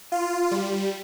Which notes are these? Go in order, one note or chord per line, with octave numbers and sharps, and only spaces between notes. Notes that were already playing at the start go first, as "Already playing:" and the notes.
F4
G3